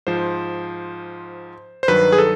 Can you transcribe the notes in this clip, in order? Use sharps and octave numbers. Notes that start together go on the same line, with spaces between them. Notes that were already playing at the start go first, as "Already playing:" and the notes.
G#2 F3 C5
C5
G2 D#3 F#3 B4
G#4
A4